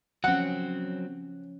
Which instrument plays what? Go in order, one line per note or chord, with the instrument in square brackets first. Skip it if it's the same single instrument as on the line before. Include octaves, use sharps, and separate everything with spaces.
[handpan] F3 C#4 [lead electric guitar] F#3 C4 [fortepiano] F#5